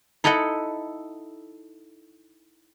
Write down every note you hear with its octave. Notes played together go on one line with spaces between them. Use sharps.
D#4 E4 A4 D#5 F#5